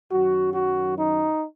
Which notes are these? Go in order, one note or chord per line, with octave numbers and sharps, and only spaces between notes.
F#2 D#3 F#3 F#4
F#4
D#4